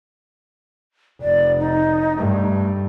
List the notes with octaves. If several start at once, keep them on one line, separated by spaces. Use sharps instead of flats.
F1 D5
D#4
G2 A3